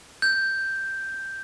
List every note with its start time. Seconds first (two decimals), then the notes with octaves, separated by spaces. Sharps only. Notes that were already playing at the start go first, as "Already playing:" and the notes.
0.22 G6